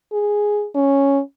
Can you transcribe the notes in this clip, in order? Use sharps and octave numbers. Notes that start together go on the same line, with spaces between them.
G#4
C#4